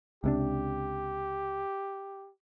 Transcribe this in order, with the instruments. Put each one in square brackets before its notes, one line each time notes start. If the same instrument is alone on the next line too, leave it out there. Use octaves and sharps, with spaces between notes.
[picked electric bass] C#2 C3 D4 [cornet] G4